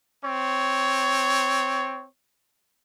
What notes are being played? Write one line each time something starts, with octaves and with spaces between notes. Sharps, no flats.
C4 C#5